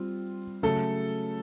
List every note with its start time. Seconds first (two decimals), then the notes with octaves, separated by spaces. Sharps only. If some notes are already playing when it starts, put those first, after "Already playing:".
Already playing: G3 C4 F4
0.63 C#3 F#3 A3 A4